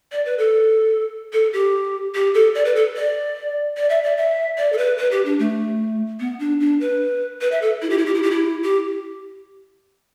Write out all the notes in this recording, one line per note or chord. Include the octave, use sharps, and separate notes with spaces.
D5
B4
A4
A4
G4
G4
A4
D5
B4
A4
D5
D5
E5
D5
E5
D5
A4
B4
B4
G4
D4
A3
B3
D4
D4
B4
B4
E5
A4
E4
G4
E4
G4
E4
G4
E4
G4